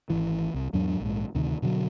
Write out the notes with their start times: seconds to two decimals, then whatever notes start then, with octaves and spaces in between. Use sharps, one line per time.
0.10 G#1 E3
0.54 C2
0.73 E2 G#2 F#3 D4
1.00 A#1 G#2
1.35 D2 C3 D#3
1.62 B2 D3 F3 F#3